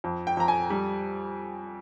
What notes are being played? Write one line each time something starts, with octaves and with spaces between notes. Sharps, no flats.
F2
G5
F2 A#5
G#5
G3